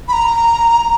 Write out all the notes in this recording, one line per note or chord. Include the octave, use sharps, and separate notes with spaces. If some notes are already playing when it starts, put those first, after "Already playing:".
B5
A#5